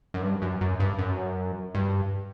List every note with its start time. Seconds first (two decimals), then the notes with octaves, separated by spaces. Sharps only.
0.14 F#2
0.22 G2
0.42 F#2
0.61 F#2
0.80 G2
0.98 F#2
1.75 G2